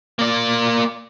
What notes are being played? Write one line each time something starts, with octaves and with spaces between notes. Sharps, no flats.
A#3 D5